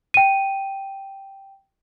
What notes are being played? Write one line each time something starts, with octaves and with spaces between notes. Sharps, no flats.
G5 D#7